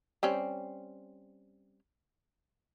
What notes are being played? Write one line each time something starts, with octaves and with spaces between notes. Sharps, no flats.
G3 C4 C#4